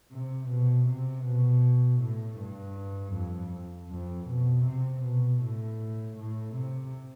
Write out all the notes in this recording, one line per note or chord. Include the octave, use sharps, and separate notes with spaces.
C3
B2
C3
B2
A2
G2
F2
F2
B2
C3
B2
A2
A2
C3